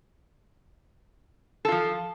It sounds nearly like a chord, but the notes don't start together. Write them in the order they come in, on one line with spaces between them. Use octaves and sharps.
A4 F4 F3